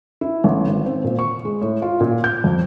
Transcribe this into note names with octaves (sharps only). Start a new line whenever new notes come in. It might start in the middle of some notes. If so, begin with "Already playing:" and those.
E4
A1
G#1
C4
A#2
C#6
G#3
A2
F4
A#2
G6
F2